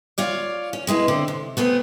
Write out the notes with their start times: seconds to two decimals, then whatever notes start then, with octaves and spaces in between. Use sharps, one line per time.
0.18 F4 C#5 D5
0.73 C#4
0.87 B2 G#3 E4 B4
1.08 D3 C4
1.28 C3
1.57 A3 B3 C4 G#4